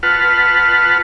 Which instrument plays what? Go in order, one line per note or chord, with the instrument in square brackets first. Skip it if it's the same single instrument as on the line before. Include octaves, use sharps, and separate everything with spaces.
[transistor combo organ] F4 B4 F#5 A5 F6